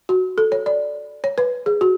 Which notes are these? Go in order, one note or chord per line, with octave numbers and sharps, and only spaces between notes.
F#4
A4
C#5
D5
C#5
B4
G#4
F#4